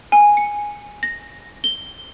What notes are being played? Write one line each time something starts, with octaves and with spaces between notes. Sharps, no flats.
G#5
C#7
A#6
G7